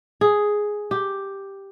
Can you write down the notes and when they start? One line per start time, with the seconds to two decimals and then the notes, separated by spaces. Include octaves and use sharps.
0.21 G#4
0.91 G4